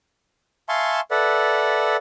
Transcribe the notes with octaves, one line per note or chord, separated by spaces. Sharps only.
E5 F5 G#5 A5 C6 C#6
A4 B4 D5 E5 F#5